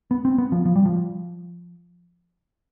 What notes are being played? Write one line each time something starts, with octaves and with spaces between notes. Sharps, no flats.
B3
C4
B3
F3
F3
G3
F3